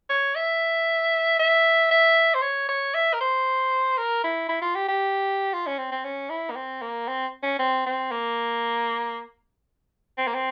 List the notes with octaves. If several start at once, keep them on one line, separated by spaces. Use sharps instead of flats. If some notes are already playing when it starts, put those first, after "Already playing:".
C#5
E5
E5
E5
C5
C#5
C#5
E5
A#4
C5
A#4
E4
E4
F4
G4
G4
F4
C#4
C4
C4
C#4
E4
A#3
C4
A#3
C4
C#4
C4
C4
A#3
C4
A#3
C4